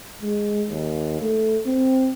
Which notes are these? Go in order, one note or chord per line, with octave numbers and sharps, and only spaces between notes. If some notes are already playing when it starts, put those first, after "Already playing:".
G#3
D#2
A3
C4